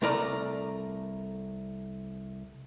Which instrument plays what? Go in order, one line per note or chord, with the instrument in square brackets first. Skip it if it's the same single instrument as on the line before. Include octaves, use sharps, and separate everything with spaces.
[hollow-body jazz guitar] C2 A3 A#4 D5 A#5